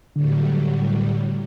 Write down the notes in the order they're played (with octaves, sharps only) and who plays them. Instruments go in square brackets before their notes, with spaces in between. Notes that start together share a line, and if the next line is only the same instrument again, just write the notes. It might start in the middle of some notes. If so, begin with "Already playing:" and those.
[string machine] A2 F#3 G3 [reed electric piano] D3